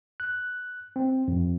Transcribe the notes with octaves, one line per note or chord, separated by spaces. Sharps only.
F#6
C4
F2